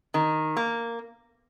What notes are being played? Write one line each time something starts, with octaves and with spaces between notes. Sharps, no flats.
D#3
A#3